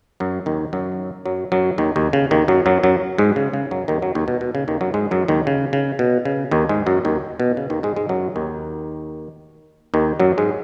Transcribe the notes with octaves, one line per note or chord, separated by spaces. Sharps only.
F#2 F#3
D#2 D#3
F#2 F#3
F#2 F#3
F#2 F#3
D#2 D#3
D#2 D#3
C#3
D#2 D#3
F#2 F#3
F#2 F#3
F#2 F#3
G#2 G#3
C#3
C#3
F#2 F#3
D#2 D#3
F#2 F#3
D#2 D#3
B2
B2
C#3
D#2 D#3
F#2 F#3
G#2 G#3
F#2 F#3
D#2 D#3
C#3
C#3
B2
C#3
D#2 D#3
G#2 G#3
F#2 F#3
D#2 D#3
B2
C#3
D#2 D#3
G#2 G#3
G#2 G#3
F#2 F#3
D#2 D#3
D#2 D#3
F#2 F#3
G#2 G#3